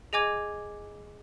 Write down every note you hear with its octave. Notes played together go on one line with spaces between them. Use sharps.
G#4 D#5 G#5 D6 G#6